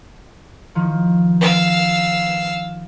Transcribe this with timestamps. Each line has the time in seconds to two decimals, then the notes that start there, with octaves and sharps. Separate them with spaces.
0.75 D#3 F3
1.41 F5 E6